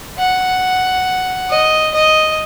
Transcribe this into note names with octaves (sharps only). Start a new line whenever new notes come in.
F#5
D#5
D#5